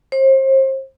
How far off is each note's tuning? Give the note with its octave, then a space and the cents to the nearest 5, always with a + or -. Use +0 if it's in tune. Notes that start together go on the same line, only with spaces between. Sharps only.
C5 +35